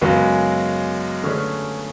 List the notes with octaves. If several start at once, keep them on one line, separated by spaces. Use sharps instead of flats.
F#2 C#3 G#3 B3 F#4
D3 A3 C#4 G#4 B4